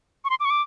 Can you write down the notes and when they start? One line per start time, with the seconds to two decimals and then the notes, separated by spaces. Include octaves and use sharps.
0.25 C#6
0.30 C6
0.40 D6
0.45 C#6
0.50 D6